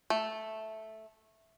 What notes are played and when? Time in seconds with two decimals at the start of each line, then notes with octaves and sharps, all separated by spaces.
0.10 A3